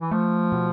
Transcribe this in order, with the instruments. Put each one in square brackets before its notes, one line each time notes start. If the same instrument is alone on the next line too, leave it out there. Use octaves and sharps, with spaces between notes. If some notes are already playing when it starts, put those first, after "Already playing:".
[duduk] E3
[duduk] F3 [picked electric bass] A3
[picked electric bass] B2